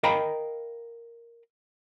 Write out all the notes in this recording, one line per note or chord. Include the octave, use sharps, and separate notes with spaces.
A#4 D#5 F5 G5 A#5 B5